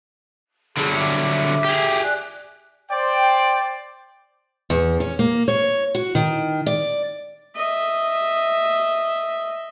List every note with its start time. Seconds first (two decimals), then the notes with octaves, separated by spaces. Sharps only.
0.77 D3 F#3 G3 G#4
0.94 E5 D6
1.64 G4 G#4
2.02 D5 G#5 F#6
2.91 C5 D5 G5
4.70 E2
5.00 C#4
5.19 A#3
5.48 C#5
5.95 F#4
6.15 D#3
6.66 D5
7.56 D#5 E5